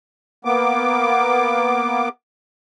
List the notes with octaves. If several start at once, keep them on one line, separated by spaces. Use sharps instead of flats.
A#3 B3 D6